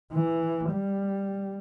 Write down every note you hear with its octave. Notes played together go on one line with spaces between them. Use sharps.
E3
G3